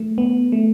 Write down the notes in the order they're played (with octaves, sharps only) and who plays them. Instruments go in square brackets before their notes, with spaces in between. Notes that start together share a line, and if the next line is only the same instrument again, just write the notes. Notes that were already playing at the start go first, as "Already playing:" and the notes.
Already playing: [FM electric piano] A3
B3
A3